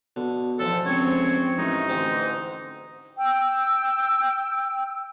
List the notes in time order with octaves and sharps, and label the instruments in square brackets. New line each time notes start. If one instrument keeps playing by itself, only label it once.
[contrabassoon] B2 [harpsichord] D3
[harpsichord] E2 G#2 F3 [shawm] A4
[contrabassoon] C#2 [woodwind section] C4 [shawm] C#5
[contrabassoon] A1 [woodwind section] D#3 G#3 A3 [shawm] D#4
[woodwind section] D2 D3 E3 [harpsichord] G#2 G#3 C4
[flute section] G5 E6